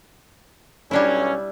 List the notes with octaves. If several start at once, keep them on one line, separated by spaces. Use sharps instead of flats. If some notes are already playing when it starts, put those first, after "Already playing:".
B1 G3 C#4 D4 E4